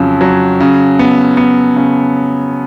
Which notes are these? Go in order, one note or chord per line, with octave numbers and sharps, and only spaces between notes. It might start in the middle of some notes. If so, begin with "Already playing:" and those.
Already playing: F2 C#3 F#3
F#3
C#3
B3
B3
C#3